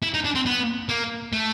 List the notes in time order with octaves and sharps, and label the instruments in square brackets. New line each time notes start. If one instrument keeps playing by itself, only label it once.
[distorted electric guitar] E4
D#4
D4
C4
B3
A#3
A3